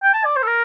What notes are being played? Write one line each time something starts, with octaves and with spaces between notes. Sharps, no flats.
G5
A5
D5
C5
A4
A#4